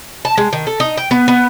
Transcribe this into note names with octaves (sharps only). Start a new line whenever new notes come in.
A5
G#3
D#3
A4
D#4
G5
B3
B3